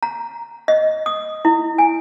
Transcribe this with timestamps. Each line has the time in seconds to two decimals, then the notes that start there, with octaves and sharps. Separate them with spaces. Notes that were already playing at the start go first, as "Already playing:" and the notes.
0.03 A#5
0.68 D#5
1.06 D#6
1.45 E4
1.78 G#5